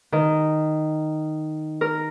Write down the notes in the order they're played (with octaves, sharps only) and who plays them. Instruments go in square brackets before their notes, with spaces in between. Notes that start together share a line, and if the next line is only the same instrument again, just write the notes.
[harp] D#3
A#4